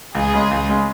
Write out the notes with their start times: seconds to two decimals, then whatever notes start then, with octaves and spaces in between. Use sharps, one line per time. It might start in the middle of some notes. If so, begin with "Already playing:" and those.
0.15 C#2 G#4
0.34 C#3 G#3
0.51 C#2
0.69 C#3 G#3